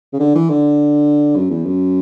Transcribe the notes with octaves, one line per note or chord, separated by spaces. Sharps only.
C#3
D3
E3
D3
F#2
E2
F#2